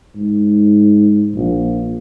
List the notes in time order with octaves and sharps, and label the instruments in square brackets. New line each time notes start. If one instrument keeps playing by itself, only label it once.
[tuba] G#2
A#1